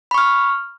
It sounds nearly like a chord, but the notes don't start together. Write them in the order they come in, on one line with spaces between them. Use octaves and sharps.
B5 C#6 F6